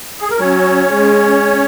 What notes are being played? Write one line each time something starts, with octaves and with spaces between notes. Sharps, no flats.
G#4
A#4
F#3 C#4 C#5
G#3